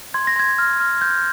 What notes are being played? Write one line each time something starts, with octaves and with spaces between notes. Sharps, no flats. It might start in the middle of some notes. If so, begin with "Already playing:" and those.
C6 G#6
A#6
C6 G#6
F6
F6
G6